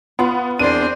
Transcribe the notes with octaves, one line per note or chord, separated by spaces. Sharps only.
B3 F4 B5
E2 C4 D4 A#4 C5 D5 D#7